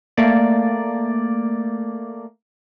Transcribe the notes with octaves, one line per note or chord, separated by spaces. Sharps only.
A3 A#3 D5